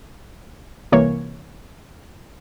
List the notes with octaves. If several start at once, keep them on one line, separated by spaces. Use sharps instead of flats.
C2 E3 A#3 C#5